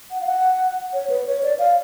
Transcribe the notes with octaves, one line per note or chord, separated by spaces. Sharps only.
F#5
F5
F#5
C#5
B4
C#5
D5
F5